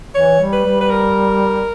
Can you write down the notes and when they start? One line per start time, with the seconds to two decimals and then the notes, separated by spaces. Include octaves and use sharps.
0.15 E3 C#5
0.40 G3
0.52 B4
0.65 G3
0.81 B4
0.90 A#4